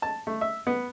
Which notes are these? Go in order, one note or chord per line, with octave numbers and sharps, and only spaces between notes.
A5
A3
E5
B3